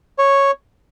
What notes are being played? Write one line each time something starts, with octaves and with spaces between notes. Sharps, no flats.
C#5